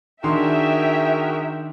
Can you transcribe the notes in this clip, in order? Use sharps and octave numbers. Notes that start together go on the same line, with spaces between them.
D#3 D4 F#4 G#4 A#4 E5 G5 C6